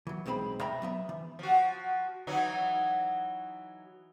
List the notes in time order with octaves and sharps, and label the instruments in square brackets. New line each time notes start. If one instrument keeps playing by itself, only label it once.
[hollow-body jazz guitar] E3 F#3
B1 G#3 C4 C5 B5
C3 E5 G5 A#5 B5
F#3 B3 E5
E3
[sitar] F3 F#4
E3 F#3 D#4